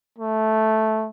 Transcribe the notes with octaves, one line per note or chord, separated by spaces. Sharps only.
A3